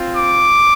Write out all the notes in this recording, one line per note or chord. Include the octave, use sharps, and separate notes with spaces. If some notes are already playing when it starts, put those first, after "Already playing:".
Already playing: C4 F4
D6